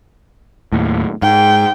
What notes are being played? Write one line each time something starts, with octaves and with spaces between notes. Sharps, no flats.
D#2 A2
G#2 G5